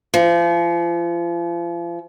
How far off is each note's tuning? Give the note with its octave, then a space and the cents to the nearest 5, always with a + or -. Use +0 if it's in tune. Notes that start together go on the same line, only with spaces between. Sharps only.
F3 -35